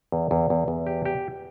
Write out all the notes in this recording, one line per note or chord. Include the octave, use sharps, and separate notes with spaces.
E2
E2
E2
E2
G4
G4